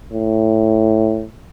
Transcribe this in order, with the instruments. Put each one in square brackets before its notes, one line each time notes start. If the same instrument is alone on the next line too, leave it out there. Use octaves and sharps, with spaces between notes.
[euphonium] A2